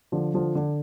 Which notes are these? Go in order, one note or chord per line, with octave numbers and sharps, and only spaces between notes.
D3 F3
D3 F3
D3